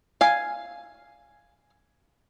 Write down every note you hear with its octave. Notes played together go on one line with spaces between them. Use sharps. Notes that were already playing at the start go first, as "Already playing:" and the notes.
F5 G#5